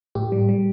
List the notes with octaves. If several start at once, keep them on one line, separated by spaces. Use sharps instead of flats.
A2 G4
G3
G3